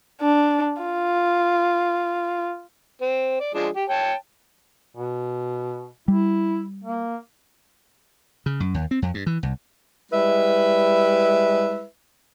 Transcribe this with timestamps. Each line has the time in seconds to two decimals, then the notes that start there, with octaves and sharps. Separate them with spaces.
0.21 D4
0.82 F4
3.01 C4
3.40 D5
3.54 F3 G#3 D4
3.76 G4
3.90 C#5 G5 A5
4.97 B2
6.08 G3 E4
6.84 A#3
8.46 C#3
8.60 F#2
8.74 D#2
8.91 C4
9.02 F2
9.14 G2
9.27 E3
9.43 C2
10.12 G3 G#3 E4 B4 E5